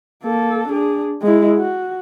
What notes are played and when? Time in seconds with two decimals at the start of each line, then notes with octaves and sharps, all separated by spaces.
0.24 A#3 A4
0.68 D4 G#4
1.22 G#3 E4
1.58 F#4